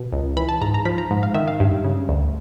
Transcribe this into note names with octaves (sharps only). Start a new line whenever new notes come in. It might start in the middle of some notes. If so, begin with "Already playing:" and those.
Already playing: B2
C#2
E3 B5
A5
G#2 A#5
A#5
F3 B5
A#5
G#2
F5
D#3 E5
F5
G2
C#3
D2